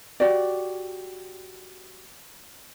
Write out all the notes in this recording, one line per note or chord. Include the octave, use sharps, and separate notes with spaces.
F#4 G4 D5